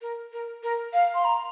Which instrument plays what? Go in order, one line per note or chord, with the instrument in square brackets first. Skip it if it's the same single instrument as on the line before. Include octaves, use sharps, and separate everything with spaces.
[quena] A#4
A#4
A#4
F5
C6
A#5